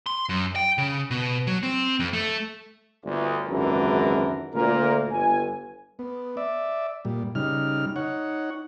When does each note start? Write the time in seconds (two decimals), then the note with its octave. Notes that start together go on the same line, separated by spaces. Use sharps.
0.06 C6
0.29 F#2
0.56 G5
0.78 C#3
1.11 B2
1.47 F#3
1.63 C4
2.00 F2
2.13 A3
3.04 G1 D2
3.49 G#1 C#2 F#2 D3 E3 A#4
4.54 D2 A#2 A#4
5.11 G1 G#5
5.99 B3
6.37 D5 E5
7.05 A#2 G3
7.35 C#3 G3 D#4 F6
7.96 D#4 C#5 F#5